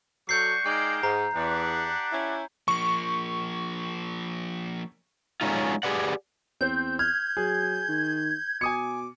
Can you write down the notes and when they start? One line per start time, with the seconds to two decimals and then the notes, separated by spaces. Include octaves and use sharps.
0.29 F#3 F#4 A4 D5 C#6 G6 C7
0.66 G#3 A#3 D#4 D5 F5 G5
1.03 G#2 A#5
1.34 E2 D4 G4 F#5
2.13 C#4 E4
2.68 F3 A#3 C#6
5.41 F#3 G#3 C#4 D#4 F4
5.83 G4 G#4 B4 D5 F#5
6.61 E2 C4 C5 G6
6.99 F6 G6 G#6
7.37 F#3 G#4
7.89 D#3
8.61 B2 G#5 D6 D#6 C#7